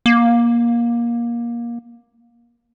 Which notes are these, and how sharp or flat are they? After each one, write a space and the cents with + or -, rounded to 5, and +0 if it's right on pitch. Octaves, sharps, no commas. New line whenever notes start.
A#3 +20